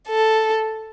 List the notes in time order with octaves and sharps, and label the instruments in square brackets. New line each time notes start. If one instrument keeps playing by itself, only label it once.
[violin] A4